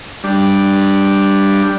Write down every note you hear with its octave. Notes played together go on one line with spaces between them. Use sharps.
G3 D4